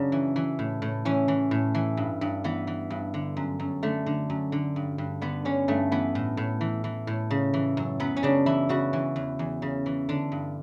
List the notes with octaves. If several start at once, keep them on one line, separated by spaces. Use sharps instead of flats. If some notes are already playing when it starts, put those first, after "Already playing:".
Already playing: F#2 C#3 D4
E3
E3
A2
A2
E3 C#4
E3
A2
E3
G2
G2
E3 B3
E3
G2
D3
F#2
F#2
D3 A3
D3
F#2
D3
G2
G2
D3 B3
D3 C#4
G2 A3
E3 B3
A2
A2
E3
E3
A2
C#3
E3
F#2
F#2 B3
C#4
C#3 D4
E3 E4
C#3 F#4
E3
E2
E2
C#3
E3
D3 D4
G2